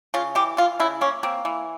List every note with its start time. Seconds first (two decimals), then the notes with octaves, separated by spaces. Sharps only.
0.14 C#3 F4
0.35 E3 G4
0.57 E3 F4
0.80 C#3 E4
1.01 A#3 C#4
1.23 A#3 C4
1.45 E3